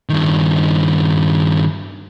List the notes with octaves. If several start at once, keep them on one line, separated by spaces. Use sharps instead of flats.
G2 D#3